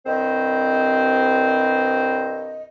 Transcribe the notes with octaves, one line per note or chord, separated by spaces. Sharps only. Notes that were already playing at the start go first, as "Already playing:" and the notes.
C2 G2 C4 C5 D#5